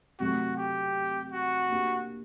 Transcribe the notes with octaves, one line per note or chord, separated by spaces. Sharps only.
C3 F#3 A3 F#4
G4
F#4
A#3 D4 G4